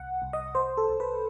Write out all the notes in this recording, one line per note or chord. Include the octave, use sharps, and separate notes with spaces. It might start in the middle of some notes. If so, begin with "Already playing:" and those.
Already playing: C2 F#5
C2
D#5
C2 C5
A4
C2
B4